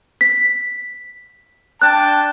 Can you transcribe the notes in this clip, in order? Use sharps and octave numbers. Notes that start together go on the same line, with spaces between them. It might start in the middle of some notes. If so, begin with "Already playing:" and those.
B6
D4 G5 A5 F#6